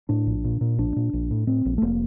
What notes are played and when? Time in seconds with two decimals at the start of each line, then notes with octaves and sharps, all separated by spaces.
0.09 A2 D4
0.27 A#1
0.44 A#2
0.61 A#2
0.78 A#1 D4
0.96 A#2
1.13 A#1
1.31 A2
1.47 A2 C4
1.65 A#1
1.78 A3
1.82 F1 A#3